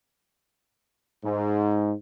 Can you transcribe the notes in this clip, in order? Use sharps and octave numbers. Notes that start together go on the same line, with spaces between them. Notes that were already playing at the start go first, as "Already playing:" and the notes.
G#2